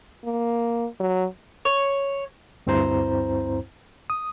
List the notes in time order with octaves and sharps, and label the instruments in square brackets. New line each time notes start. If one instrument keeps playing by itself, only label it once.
[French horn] A#3
F#3
[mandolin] C#5
[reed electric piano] D2 G2 C4 E4 C5 A#5
D#6